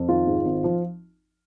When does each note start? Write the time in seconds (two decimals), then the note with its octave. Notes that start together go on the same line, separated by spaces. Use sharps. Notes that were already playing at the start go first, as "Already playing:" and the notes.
Already playing: F2
0.09 D#3 F4
0.27 G#2
0.45 G#1
0.64 F3